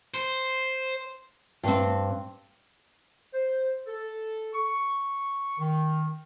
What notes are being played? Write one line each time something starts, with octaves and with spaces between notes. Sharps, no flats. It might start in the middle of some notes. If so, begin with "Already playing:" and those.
C5
G2 C4
C5
A4
C#6
D#3